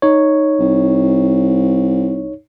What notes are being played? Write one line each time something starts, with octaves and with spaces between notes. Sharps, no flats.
D#4 C#5
C2